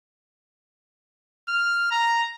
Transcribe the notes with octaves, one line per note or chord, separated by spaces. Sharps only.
F6
A#5